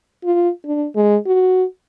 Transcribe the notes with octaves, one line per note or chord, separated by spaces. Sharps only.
F4
D4
G#3
F#4